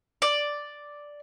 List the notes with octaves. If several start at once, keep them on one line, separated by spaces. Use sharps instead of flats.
D5